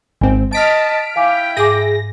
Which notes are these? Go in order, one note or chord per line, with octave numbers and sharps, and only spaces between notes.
G#1 C4 G#5
D#5 A5 F6 B6 D7
E4 F5 G5 G#5 D6
G#2 G#4 D6 A#6